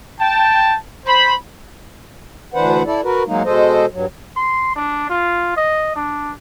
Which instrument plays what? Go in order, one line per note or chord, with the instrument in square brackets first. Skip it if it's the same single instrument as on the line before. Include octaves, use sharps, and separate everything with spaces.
[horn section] G5 A5
C5 B5
[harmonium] D2 E3 D4 B4 C5 F#5
E4 A4 D5
F#4 A#4 B4
F#3 G#3 A#3 D#4
B2 G#3 A4 C5 D#5
G2 F#3
[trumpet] C6
D4
F4
D#5
D4